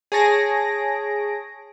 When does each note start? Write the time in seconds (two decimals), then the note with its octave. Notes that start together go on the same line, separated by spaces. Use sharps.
0.12 G#4 C#5 A5 A#6 D7